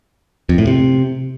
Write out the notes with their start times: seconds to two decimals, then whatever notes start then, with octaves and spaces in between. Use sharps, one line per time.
0.49 F2
0.58 A2
0.67 C3